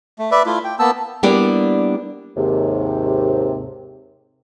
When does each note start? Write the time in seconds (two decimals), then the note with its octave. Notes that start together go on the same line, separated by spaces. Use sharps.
0.19 A3
0.31 B4 D5 E5
0.46 A3 E4 F4
0.65 G5
0.79 A#3 B3 A5 E6
1.23 G3 A#3 B3 D4 E4 G4
2.37 D#2 G#2 C3